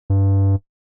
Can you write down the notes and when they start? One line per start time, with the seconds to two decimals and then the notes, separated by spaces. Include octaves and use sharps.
0.10 G2